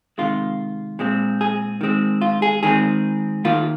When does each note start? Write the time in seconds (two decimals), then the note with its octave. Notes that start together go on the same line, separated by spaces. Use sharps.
0.18 C3 D#3 G#3 F4
0.99 A#2 G#3 C4
1.41 G#4
1.81 D#3 G#3 C4
2.21 F4
2.42 G#4
2.63 D#3 G#3 C4 G#4
3.45 D#3 A#3 F4